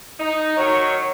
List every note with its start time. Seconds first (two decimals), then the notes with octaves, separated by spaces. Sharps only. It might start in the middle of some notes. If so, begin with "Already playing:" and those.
0.20 D#4
0.57 D#3 F#3 C#5